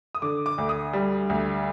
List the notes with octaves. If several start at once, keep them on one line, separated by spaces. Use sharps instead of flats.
D#6
D3 D6
D6
D2
D#6
G3
D2